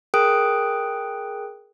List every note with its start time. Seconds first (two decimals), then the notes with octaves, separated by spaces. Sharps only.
0.14 G#4 A#4 G5 D#6 F#6 D7